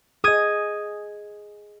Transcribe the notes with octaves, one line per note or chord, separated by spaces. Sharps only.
G#4 D#5 D#6 G#6 D#7